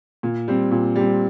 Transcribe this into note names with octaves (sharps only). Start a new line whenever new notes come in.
A#2
G3 C4
A#2
G3 C4